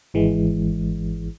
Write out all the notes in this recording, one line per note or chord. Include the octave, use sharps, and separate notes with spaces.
G#1 E3 G#3